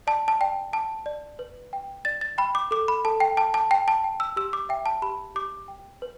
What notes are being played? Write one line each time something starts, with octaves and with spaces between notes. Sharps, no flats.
D5 A5
A5
D5 G5
G5 A5
D5
B4
G5
D5 A6
A6
G5 B5
D6
A4 D6
B5
A4 A5
G5
G5 A5
A5
G5
A5
G5
E6
G4 E6
D6
E5 G5
A5
G4 B5
G4 D6
G5
B4